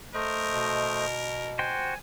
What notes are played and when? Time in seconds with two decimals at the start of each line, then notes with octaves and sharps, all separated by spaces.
0.14 A3 A#4 C5 D#5
0.53 B2
1.59 F#4 C5 G5 G#5